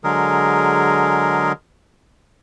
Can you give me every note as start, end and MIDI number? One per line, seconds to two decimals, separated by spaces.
0.04 1.52 50
0.04 1.52 54
0.04 1.52 56
0.04 1.52 68
0.04 1.52 70